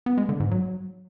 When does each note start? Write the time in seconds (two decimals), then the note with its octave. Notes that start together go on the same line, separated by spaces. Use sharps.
0.06 B3
0.18 G#3
0.29 D3
0.40 G#2
0.51 F#3